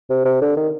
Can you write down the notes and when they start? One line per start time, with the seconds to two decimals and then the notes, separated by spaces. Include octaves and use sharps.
0.10 C3
0.25 C3
0.41 D3
0.57 D#3